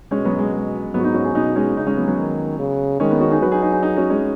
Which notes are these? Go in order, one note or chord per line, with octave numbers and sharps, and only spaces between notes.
B2 G#3 C#4
F#3 B3
G#3
G#3
G#2 F#3 B3
F#4
B3 D#4
C#4 F#4
D#4 G#4
B2 B3 D#4
G#3 C#4
C#3 D#4
G#3 C#4
F#3 B3
F#3 B3
D#3
C#3
D#3 G#3 C#4
B3 D#4
C#4 F#4
D#4 G#4
F#3 F#4 B4
D#4 G#4
D#4 G#4
D#4 G#4
D#4 G#4
C#4 F#4
G#3 C#4